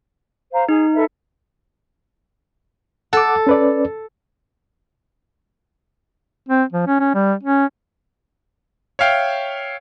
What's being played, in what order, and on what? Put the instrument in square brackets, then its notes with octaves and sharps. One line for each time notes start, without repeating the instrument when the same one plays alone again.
[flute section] C5 F5 A#5
[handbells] D#4 [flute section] G#4
[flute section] A4 B4 E5
[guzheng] A4 [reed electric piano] F#5 D6
[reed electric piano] C#4 B4 D5
[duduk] C4
F3
C#4
C#4
G3
C#4
[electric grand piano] C#5 E5 F5 G5